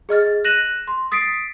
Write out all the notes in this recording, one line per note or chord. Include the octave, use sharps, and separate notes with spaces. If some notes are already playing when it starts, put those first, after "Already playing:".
G#4 D#5 F6 A6
F#6 A#6 D#7 E7 F#7
C6
D#6 A6 B6 C7 D7